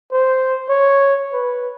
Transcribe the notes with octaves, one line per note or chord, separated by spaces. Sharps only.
C5
C#5
B4